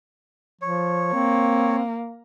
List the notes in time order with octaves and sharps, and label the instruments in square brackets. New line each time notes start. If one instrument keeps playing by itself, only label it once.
[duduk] F3 [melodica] C#5
[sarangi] A#3 [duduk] C4